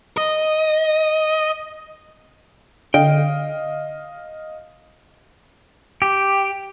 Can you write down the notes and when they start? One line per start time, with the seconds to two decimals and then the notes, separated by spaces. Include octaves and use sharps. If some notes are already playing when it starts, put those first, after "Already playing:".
0.17 D#5
2.94 D3 D#5 F5 G5
6.02 G4